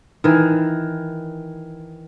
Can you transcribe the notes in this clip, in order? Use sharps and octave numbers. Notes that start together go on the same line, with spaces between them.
D#3 E3